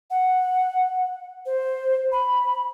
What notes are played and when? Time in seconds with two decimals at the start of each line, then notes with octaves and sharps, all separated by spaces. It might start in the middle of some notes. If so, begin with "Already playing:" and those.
0.11 F#5
1.46 C5
2.12 B5